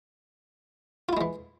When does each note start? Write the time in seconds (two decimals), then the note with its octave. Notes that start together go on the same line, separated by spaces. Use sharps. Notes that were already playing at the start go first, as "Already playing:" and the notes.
1.09 F4
1.13 E4
1.17 G#3
1.21 E3